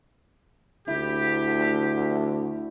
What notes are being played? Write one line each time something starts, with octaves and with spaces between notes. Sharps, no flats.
D2 E4 G4